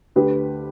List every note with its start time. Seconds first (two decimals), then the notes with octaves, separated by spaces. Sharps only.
0.16 D2 G4 B4